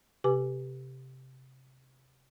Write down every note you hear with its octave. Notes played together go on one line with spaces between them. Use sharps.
C3 G4 B4 G#5 D6